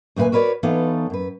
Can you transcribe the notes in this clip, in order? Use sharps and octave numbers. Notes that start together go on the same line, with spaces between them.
D2 A#2 F4 B4 G#5
F#4 A#4 B4 C#5 D5
E3 B3 D#4 F4 A4 C#5
F#2 B4